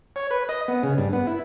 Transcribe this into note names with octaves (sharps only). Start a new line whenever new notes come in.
C#5
B4
D#5
B3
C#3
G2
B3
E4